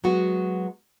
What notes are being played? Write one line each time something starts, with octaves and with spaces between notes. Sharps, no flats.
F#3 G#3 B3 F#4